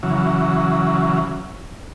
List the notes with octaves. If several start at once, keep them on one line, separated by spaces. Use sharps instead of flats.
C#3 E3 F#3